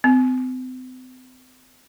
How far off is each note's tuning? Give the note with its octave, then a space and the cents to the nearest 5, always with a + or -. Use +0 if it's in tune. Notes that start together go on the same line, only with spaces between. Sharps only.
C4 -40